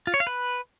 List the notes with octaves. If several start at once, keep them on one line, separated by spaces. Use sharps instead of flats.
F4
C#5
F5
B4